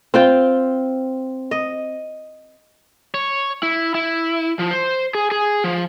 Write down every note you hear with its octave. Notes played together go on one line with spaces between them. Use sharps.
C4 F4 G5
D#5
C#5
E4
E4
F3
C5
G#4
G#4
F3